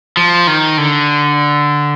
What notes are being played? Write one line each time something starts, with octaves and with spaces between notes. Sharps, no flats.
F3
D#3
D3